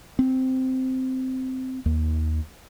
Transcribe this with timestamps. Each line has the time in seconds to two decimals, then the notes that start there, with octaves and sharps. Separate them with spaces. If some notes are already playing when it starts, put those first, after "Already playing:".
0.19 C4
1.86 D#2